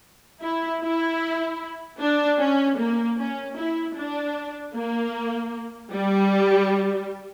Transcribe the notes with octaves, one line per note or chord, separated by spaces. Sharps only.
E4
E4
D4
C#4
A#3
C#4
E4
D4
A#3
G3